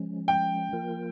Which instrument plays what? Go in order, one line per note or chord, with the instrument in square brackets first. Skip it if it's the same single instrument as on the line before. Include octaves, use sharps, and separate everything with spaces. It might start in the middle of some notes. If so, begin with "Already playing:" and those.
Already playing: [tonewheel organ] F3 G#3 C#4
[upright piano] G5
[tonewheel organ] F3 A#3 F4 A#4